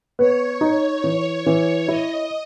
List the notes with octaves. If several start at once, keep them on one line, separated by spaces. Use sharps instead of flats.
B3 C#5
D#4
E3
E3
E4 D#5